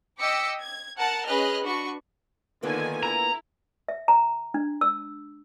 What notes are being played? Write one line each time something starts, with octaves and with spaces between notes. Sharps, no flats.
D#5 G5 D6 E6 B6 C#7
G#6
A#4 F#5 A5
C#4 G#4 B4 D#5 F6 F#6
D4 F#4 B4 C#6
D3 D#3 A#3 B3 F4 G#5
E4 A#5
E5
A#5
D4
E6